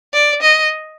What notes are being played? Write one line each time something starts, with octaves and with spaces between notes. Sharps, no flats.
D5
D#5